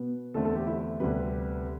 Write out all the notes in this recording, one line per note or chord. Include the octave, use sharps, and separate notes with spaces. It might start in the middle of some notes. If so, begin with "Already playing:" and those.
Already playing: B2 B3
E2 D3 A3 C4 A4
A4
G4
E4
D2 C3 G3 B3 B4